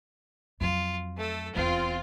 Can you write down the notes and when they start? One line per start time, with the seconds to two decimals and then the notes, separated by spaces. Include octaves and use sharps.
0.61 F2 F#3 F4
1.17 A3 A4
1.55 D#1 E2 C4 F4